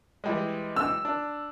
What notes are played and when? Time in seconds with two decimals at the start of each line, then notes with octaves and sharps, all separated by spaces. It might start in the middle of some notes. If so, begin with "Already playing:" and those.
0.24 E3 G3 G#3
0.76 E6
1.05 D4